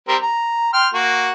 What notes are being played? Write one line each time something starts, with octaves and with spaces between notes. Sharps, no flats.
G3 C4 A#4
A#5
G5 C6 F6
A#3 F#4